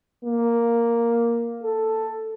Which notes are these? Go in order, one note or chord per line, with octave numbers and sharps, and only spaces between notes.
A#3
A4